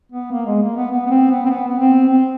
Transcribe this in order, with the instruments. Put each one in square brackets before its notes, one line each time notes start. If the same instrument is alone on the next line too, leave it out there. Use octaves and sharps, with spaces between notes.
[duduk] B3
A#3
G#3
A#3
B3
B3
B3
C4
B3
C4
B3
B3
C4
C4